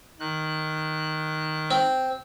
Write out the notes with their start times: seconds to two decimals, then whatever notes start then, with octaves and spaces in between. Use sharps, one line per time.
0.20 D#3 F#6
1.71 C4